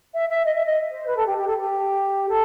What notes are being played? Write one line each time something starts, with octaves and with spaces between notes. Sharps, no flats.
E5
E5
D#5
E5
D#5
C5
B4
A4
G4
G4
A4
G4
A4